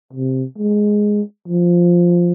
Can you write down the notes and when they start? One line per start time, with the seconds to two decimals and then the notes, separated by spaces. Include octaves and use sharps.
0.13 C3
0.58 G#3
1.48 F3